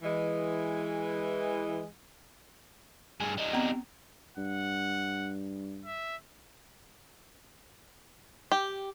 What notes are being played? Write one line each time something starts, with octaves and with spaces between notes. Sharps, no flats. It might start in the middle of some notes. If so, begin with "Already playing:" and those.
E3 G#3
G2 G#4
G3 D#4
B3 C4 A#5
G2 F#5
E5
G4